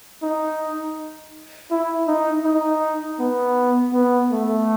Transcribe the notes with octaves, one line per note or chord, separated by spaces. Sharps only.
D#4
E4
D#4
D#4
B3
B3
A3